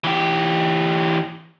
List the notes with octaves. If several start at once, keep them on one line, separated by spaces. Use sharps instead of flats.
E3 G4